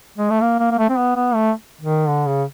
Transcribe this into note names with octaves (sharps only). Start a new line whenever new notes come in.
G#3
A3
A#3
A#3
A#3
A3
C4
B3
B3
A3
D#3
D3
C#3